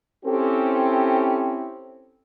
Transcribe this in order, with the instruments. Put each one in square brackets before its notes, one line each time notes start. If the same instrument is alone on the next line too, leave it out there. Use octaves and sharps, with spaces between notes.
[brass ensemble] C4 C#4 E4 G4 A4